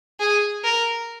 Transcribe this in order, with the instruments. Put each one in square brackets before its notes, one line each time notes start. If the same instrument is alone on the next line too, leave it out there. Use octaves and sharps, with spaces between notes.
[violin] G#4
A#4